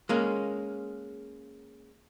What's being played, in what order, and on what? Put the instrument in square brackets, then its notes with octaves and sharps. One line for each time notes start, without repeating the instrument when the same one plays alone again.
[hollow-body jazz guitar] G#3 A#3 C#4